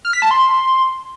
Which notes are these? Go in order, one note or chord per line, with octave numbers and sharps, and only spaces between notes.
F6
B6
A5
C6